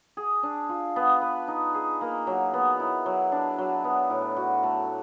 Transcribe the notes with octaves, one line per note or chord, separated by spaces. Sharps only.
G#4
D4
F4
B3
B4
D#4
G#4
A#3
F#3
B3
E4
F#3
D4
F#3
B3
A2
F#4
A3